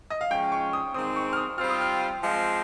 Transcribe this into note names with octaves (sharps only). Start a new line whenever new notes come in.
D#5
F5
C#3 F3 G#3 C#4 G5
C#6
D#6
D#3 G#3 C4 D#6
C#6
F6
D#6
G3 C4 F4 F6
D#6
F6
F3 G#3 C4